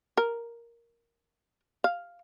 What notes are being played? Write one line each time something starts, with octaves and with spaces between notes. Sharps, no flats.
A#4
F5